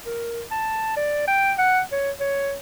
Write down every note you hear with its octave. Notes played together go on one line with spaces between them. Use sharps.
A#4
A5
D5
G5
F#5
C#5
C#5